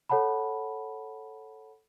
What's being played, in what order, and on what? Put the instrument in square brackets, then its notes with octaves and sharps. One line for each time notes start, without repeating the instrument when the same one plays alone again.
[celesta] A4 C#5 F#5 A5 B5